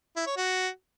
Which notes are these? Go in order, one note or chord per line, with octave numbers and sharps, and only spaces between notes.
E4
C#5
F#4